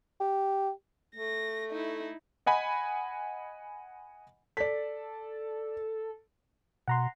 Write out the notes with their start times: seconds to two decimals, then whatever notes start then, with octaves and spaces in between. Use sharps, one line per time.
0.20 G4
1.16 A3 A#6
1.70 D#4 E4
2.46 D#5 F#5 G#5 B5
4.57 A4 D5 B6
6.88 B2 F#5 A#5 C6